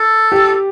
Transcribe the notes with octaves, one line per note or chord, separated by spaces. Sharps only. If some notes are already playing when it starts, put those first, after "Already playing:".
Already playing: A4
G4